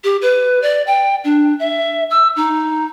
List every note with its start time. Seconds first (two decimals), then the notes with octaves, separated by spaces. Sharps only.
0.04 G4
0.21 B4
0.62 D5
0.86 G5
1.24 D4
1.59 E5
2.10 E6
2.36 D#4